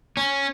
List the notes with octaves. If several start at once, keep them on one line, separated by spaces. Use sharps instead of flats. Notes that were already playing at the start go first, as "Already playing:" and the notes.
C#4